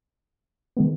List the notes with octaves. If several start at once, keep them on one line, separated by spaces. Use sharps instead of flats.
D#3 G#3 B3